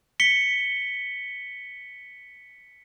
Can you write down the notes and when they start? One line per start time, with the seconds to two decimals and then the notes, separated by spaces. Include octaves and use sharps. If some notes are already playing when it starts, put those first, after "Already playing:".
0.20 B6 C#7 G7